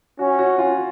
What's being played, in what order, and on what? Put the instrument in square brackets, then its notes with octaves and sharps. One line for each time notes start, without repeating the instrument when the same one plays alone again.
[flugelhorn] C#4 [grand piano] F#4
[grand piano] F#4
F4